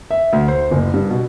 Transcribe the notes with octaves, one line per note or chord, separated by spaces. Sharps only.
E5
D2
C5
F#1
G2
B2